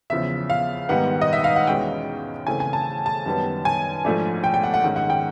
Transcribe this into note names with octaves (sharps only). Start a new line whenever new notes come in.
E2 C#3 F3 E5
F5
G#2 D#3 G3 B3 D#4 F#5
D#5
E5
F5
F#5
E2 B2 G#3 C#4 G5
C#3 E3 A3 C4 G#5
G#5
A5
A5
F#2 D#3 G3 B3
G#5
G#2 F3 A3 D4
G5
G5
F#5
F#5
G#2 D#3 G#3 C#4
F#5
G5